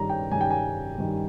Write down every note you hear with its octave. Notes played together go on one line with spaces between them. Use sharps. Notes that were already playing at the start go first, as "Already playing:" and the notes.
Already playing: G2 D#3 G3 A#5
G5
G2 D#3 G3 G#5
G5
G#5
G2 D#3 G3